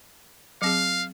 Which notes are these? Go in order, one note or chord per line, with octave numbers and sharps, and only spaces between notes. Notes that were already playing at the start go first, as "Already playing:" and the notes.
F#3 C4 G#4 F5